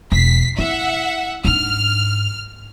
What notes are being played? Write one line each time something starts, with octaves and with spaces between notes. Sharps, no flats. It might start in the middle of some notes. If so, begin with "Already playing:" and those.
E1 B6 C7
E4 E5 F#5
G#2 D4 F6